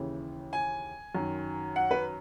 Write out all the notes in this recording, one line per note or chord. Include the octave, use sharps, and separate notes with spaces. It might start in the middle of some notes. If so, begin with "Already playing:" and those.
Already playing: D#2 C#3 E3
G#5
F#2 D#3
F#5
B4